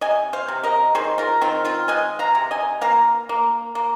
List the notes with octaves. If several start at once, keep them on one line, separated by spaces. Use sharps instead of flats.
C3 D#5 G#5
C5 F5
C3
A#4 D#5
D#3 G#4 C5
F4 A#4
D#3 C4 F4
C4 F4
G#3 D#5 G#5
F5 A#5
C3
D#5 G#5
A#3 F5 A#5
A#3
A#3